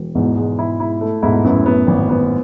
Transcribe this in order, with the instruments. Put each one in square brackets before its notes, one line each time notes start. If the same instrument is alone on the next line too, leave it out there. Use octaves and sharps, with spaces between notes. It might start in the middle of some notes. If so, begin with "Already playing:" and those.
Already playing: [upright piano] E1
[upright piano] E2 [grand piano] G#2 B2
[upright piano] G#3
E4
E4
A3
[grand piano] G#2 B2 [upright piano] E4
[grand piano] F#2 A2 [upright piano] B3
[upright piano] B3
G#1
B3